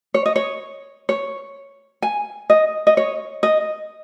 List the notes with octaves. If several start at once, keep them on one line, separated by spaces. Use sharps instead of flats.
C#5
D#5
C#5
C#5
G#5
D#5
D#5
C#5
D#5